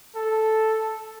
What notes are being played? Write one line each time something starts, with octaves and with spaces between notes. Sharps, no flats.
A4